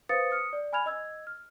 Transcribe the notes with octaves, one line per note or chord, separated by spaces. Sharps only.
B4 C5 F5 D#6 A6 C#7
D#6 F6 C#7
D5
G#5 B5 F6 G#6 F7
D#5 E6 G#6
F6